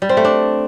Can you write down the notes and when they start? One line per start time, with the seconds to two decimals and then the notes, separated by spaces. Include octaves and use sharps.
0.02 G3
0.09 C4
0.17 A3
0.25 D4